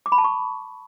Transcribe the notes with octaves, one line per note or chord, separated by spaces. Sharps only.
D6
B5
A5
C#6